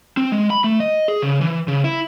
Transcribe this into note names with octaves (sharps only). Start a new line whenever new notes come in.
C4
G#3
B5
A3
D#5
G#4
C#3
E3
C#3
E4